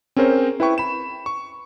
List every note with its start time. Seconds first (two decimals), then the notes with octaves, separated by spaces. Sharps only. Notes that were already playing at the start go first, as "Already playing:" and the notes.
0.16 C4 C#4 G#4 A#4 C5 C#5
0.60 E4 B4 G5 C#6
0.78 B5 E7
1.26 C#6